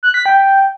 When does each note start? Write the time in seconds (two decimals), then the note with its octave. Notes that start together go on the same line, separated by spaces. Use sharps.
0.03 F#6
0.14 B6
0.26 G5